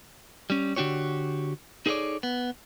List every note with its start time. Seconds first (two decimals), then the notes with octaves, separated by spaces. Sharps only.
0.50 G3 C#4
0.76 D3 D4 F#4 G4 C#5
1.86 D#4 G#4 A4 B4 C#5 D5
2.23 B3